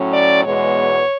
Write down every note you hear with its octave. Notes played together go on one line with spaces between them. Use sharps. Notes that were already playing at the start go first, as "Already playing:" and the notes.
Already playing: A2 F#3 C#4
D5
E2 B2 G#3 B3 C#5